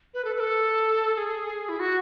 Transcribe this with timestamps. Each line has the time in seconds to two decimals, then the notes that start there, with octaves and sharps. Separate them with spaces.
0.14 B4
0.24 A4
0.36 B4
0.40 A4
1.13 A4
1.17 G#4
1.69 E4
1.79 F#4